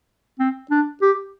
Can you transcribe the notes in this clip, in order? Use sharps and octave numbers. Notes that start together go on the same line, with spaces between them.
C4
D4
G4